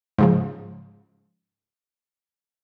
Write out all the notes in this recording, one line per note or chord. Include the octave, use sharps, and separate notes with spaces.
G#2 C#3 F3